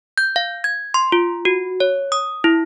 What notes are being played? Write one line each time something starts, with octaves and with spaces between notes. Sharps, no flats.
G6
F5
G#6
C6
F4
F#4
C#5
D#6
E4